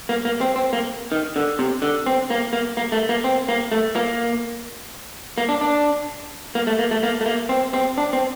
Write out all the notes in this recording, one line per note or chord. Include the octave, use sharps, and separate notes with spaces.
A#3
A#3
C4
C4
A#3
D#3
D3
C3
D3
C4
A#3
A#3
A#3
A3
A#3
C4
A#3
A3
A#3
A#3
D4
D4
A#3
A3
A#3
A3
A#3
A3
A#3
C4
C4
D4
C4